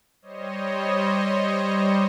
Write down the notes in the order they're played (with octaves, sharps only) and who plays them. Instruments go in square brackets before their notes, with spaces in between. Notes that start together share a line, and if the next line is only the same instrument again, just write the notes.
[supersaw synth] G3 C5 C#5 D#5